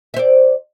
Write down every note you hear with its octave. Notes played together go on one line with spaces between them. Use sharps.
C5 D5 E5